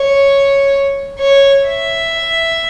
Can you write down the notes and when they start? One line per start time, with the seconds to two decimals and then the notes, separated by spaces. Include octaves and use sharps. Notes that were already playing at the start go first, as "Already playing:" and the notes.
Already playing: C#5
1.19 C#5
1.66 E5